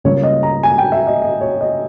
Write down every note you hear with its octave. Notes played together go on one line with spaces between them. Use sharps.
C#2 C#3 G3 A#3 C#5
D#5
A#5
G#5
G5
E5
D#5
D#5
C#5
D#5